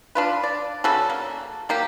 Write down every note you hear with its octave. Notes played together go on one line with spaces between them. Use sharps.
D4 F4 B4
D5
C#3 F#4 A4
A#3
F#3 A#3 G4